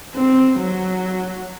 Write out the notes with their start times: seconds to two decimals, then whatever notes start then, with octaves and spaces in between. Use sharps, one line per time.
0.14 C4
0.60 F#3